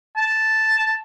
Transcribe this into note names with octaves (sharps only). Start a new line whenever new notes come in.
A5